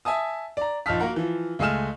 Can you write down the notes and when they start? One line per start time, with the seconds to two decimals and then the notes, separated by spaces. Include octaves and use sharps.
0.05 E5 G#5 A5 D#6
0.57 D5 A#5
0.86 A#1 F3 D#4 A5 F6 B6
1.00 A#3 F#4 A#4 F#5
1.16 E3 F3
1.59 C#2 G#3 A3 G#5 F6 E7